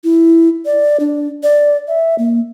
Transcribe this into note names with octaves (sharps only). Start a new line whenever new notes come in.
E4
D5
D4
D5
E5
A#3